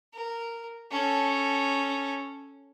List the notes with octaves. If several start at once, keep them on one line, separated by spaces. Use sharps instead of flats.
A#4
C#4 A4